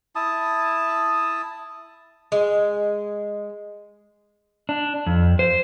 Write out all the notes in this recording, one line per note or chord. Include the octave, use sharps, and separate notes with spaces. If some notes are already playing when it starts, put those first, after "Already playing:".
E4 A5 D#6
G#3
D4
F2
C5